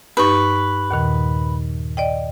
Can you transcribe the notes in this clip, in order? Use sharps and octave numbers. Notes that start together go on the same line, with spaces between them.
G2 D#4 G4 B4 C#6
D#2 A#2 D#3
D5 D#5 G5